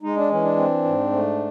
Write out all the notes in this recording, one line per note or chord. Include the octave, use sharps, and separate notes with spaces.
G#3 D#4
D4
E3 C#4
D4
C4
G#2
A3